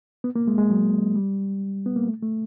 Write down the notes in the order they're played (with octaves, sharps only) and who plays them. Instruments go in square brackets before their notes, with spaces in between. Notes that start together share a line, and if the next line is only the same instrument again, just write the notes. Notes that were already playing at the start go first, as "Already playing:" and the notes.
[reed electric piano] B3
A#3
G#3
G#3
F#3
G3
B3
A#3
A3
A3